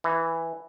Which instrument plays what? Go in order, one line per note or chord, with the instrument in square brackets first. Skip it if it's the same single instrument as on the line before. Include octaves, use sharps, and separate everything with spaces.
[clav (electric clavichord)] E3